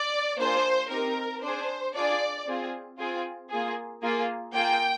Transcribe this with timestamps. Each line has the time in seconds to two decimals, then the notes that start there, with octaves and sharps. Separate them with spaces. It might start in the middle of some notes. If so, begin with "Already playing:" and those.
Already playing: D5
0.39 A#3 D4 F4 G#4 C5
0.90 C4 D#4 G4 A#4
1.42 D4 G#4 C5
1.94 D4 F4 G#4 D5
2.47 C4 F4 G#4
2.98 C4 F4 G#4
3.50 A#3 F4 G#4
4.03 A#3 F4 G#4
4.55 A#3 F4 G#4 G5